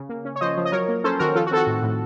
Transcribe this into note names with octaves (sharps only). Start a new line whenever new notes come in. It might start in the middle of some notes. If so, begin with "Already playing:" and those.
Already playing: C#3
A#3
C#4
C#5
F3 C5 D#5
F3
D#5
F#3 A#4 C#5
A#3
C#4 A4 C5
D#3 F#4 A#4
F3 F4 A4
F#4
C4 A4
F#4
A2
A2